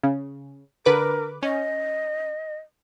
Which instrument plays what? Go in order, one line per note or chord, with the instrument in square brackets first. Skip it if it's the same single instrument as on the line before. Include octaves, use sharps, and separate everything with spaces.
[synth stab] C#3
[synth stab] D3 B4 D6 [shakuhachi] A#4
[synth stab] C#4 [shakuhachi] D#5